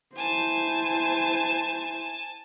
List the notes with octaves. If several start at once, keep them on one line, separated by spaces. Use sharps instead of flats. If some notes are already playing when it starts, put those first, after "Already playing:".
E4 C5 G#5 A5